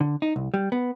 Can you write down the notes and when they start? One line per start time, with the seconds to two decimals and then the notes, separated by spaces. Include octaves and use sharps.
0.01 D3
0.22 D#4
0.36 C2
0.54 G3
0.72 B3